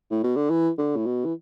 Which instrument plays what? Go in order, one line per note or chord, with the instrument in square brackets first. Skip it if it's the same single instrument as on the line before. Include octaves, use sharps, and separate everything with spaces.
[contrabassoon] A2
B2
D3
E3
D3
A2
B2
E3